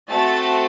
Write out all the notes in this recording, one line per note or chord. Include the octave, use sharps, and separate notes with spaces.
A3 C4 F#4 A4 A6